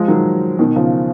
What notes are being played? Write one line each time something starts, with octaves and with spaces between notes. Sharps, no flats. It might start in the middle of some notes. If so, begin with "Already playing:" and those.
Already playing: F3 G#3
D#3 F#3
B2 D#3
C#3 F3